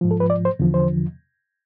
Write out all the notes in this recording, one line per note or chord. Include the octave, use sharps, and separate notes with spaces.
G#2 F3
A4
B4
D5
C5
E2 D3 F3
C5